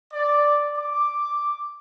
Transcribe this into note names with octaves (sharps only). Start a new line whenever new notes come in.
D5
D6